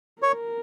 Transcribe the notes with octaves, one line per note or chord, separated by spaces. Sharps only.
A#4 C#5